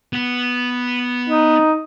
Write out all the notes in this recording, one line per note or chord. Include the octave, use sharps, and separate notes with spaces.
B3
D#4